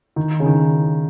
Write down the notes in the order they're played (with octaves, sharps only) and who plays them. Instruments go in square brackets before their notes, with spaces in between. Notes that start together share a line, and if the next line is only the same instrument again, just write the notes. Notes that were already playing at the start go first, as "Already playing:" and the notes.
[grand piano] D#3
C#3
D#3